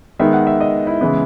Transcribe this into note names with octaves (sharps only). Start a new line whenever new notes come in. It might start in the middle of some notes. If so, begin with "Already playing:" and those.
D#3 G#3 B3 E5
F#5
E5
D#5
E4
C#3 E3 G#3 B3